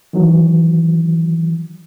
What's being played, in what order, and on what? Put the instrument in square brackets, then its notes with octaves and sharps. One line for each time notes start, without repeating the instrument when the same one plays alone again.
[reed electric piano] D#3 E3 F#3